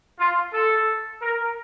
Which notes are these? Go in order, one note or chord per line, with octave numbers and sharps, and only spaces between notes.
F4
A4
A#4